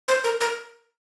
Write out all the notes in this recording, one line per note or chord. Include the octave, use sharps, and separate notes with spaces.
C5
A#4
A#4